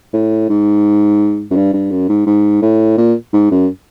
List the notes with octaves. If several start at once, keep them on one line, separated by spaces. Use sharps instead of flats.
A2
G#2
F#2
G2
G2
F#2
G#2
G#2
A2
A#2
G#2
F#2